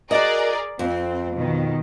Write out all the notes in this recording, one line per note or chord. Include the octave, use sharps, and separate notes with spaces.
F#4 G#4 A#4 D5 D#5
F2 C4
B2 D#3